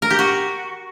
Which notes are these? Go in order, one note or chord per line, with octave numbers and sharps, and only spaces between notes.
A#4
G4
F#4